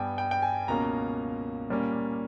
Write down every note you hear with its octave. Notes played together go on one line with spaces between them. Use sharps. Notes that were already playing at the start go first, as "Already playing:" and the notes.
Already playing: G2 G3 B3 G5 G#5
G5
G5
G#5
C#2 B2 A#3 C#4 A#5
A#2 G3 A#3 C#4